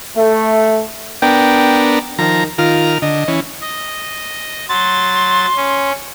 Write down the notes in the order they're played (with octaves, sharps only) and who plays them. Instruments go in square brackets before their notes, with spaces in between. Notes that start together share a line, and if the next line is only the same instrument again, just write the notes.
[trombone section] A3
[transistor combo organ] B3 D4 A#4 [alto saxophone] G5
[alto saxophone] D#3 [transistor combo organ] F3 A#5
[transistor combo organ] D#3 A#4 F6 [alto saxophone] F4
[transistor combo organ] D3 [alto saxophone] D#5
[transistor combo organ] E3 C#4
[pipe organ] D#5
[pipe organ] F#3 A6 [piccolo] C6
[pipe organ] C#4